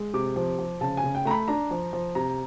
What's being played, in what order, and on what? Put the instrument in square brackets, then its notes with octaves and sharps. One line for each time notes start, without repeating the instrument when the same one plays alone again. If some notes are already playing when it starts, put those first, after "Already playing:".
Already playing: [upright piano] G#3
C3 D6
F3
F3
C#3 A5
G#5
C#3
G5
A3 A#5
B5
D4 A#5
F3
F3
C3 A#5